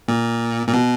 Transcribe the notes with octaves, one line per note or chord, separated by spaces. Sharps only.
A#2
A#2
B2